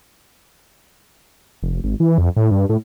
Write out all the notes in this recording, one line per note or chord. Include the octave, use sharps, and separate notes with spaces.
F1
G#1
E3
F2
A2
G2
A2